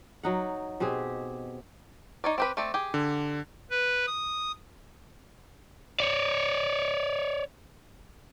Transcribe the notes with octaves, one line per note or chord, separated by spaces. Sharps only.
F#3 D#4 F#5
B2 C4 G4 G#4
D#4 C#5 D5
C4 G4 B4
A3 C4 D5
G4 G#4
D3
B4
D#6
C#5 D5